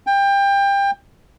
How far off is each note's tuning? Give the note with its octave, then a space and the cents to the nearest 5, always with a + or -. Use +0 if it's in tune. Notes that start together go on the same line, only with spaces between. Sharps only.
G5 +25